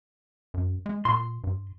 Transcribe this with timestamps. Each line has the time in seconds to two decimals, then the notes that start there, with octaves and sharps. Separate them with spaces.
0.54 F#2
0.86 G#3
1.05 A#2 C6
1.44 G2